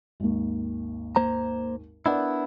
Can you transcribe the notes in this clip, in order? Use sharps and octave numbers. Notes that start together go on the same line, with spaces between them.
G#1 D#2
A#3 C5 A#5
B3 D4 E4 A#4 D5 F#5